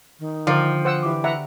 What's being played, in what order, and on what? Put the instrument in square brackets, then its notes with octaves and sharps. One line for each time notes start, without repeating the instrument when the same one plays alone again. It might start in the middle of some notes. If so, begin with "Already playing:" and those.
[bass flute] D#3
[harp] D3 G5 [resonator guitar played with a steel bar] F3 [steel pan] A#4 D5
[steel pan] C5 F#5 E6
[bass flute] E3 [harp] G4 D5 D6
[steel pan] E5 F#5 A#5